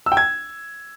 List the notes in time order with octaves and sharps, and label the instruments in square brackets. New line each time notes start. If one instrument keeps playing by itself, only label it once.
[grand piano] E6
G5
G#6